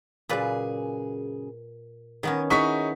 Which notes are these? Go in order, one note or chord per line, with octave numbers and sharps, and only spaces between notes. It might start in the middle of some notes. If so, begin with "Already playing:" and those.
F#2 A#2 C#3 G#4 B4 D5
D#3 B3 C#4 A#4 D#5
D#4 E4 F#4 G#4 C#5 C#6 B6